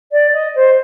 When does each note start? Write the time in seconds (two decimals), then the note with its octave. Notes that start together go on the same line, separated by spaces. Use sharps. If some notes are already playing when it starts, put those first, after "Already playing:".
0.12 D5
0.33 D#5
0.55 C5